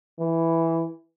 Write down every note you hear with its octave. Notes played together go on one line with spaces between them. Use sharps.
E3